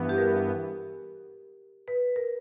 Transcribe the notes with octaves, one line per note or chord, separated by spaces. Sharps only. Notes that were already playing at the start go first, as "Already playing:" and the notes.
Already playing: G2 E3 B3
G4
A#4
B4
A#4